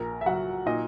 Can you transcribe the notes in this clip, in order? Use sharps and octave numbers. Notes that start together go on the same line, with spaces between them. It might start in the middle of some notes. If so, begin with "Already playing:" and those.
Already playing: A#1 A#4 A#5
E5
F#3 F#4 F#5
A#2 D#4 D#5